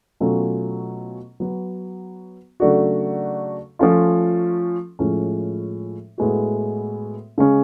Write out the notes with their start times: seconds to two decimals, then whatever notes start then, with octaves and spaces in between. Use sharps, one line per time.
0.20 B2 F#3 A3 C#4 F4
1.40 F#3 B3 F#4
2.60 C#3 F#3 A3 D4 F#4
3.79 F3 A3 C#4 F4
4.99 A2 F3 G#3 C#4
6.18 A2 G#3 B3 F#4
7.38 C#3 G#3 C#4